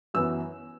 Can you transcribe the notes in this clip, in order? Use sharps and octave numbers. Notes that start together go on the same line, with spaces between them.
F#2 E3 B3 E6